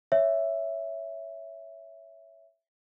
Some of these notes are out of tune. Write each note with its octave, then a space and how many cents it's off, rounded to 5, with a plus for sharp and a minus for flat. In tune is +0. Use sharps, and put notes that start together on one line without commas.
C#5 +5 E5 +0